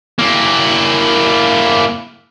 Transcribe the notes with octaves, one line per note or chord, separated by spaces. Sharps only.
A#3 E4